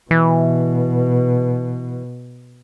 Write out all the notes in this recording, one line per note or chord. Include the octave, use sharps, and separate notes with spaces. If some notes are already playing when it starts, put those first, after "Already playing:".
B2 E3